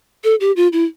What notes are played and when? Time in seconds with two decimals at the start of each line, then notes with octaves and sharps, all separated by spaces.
0.24 A4
0.40 G4
0.56 F4
0.73 E4